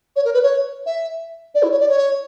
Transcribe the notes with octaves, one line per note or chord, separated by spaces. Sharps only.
C#5
A#4
B4
C#5
E5
D5
E4
C#5
D5
C#5